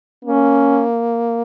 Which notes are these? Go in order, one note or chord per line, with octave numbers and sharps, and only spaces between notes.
A#3 C#4